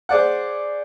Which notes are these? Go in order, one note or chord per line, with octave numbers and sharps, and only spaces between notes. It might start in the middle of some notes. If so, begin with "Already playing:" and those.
G#4 C5 D5 F#5